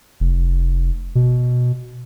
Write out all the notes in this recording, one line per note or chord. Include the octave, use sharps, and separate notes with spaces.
F1
B2